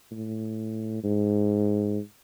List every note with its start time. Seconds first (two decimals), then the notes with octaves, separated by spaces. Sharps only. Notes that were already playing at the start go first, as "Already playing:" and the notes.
0.11 A2
1.04 G#2